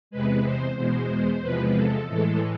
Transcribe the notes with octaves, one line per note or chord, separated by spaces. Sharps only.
E2 C3 G#3 B4
C5
E2 B2 G#3 C5
E2 C3 F3 G#3 B4
A4
A2 E3 G#3 A4